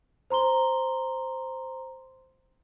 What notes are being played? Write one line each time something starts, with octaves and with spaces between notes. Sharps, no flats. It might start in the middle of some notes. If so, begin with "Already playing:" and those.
C5 A#5 C6 G7